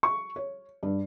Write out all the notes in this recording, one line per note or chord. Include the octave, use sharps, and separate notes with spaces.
C#6
C#5
G2